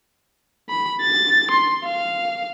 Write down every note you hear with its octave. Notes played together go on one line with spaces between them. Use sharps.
B5
A6
C6
F5